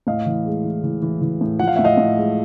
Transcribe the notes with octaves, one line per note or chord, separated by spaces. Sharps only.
A2 D#5 F5
E3
G#3
E3
E3
E3
E3
A2
F3 F#5
F5
A2 E5
D#5 F5
A2
G#3